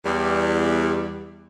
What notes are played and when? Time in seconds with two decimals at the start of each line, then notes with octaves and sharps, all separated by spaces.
0.05 E2 G3